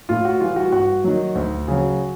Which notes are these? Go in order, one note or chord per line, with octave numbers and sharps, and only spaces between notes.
A2 F4
F#4
E3 G3 F4
F#4
G2 F#4
D#3 F#3
D2
C#3 F#3